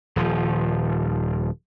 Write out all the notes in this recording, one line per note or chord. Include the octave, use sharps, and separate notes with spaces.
D#1 F3